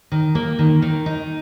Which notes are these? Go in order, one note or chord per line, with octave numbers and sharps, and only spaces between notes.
D#3
A#3
D#3
D#3
D#4